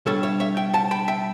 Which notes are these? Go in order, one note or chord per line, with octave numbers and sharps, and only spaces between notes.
B2 G3 D4 A4 C#5
C#5 E5
C#5 E5
E5 G5
F#5 A5
G5 B5
E5 G5